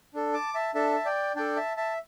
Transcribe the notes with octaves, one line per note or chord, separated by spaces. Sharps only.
D4 A4
A5 D6
E5 A5
D4 A4 E5 A5
D5 G5
D4 A4 D5 G5
E5 A5
E5 A5